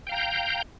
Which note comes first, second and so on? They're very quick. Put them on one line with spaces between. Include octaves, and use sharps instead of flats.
G5 F5 A#5 G6